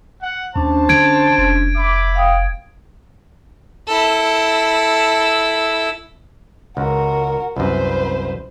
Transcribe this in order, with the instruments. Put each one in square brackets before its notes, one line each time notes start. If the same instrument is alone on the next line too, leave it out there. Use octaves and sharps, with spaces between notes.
[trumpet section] F#5
[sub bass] D#2 [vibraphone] C#4 D4 [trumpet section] C5 A5
[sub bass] D3 [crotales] G#6 D7
[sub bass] F1
[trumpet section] E5 B5 D6
[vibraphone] F5 G5 D#6
[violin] E4 A4
[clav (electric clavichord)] C#2 [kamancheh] F#4 A#4
[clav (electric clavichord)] C2 F#2 [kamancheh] B4 C5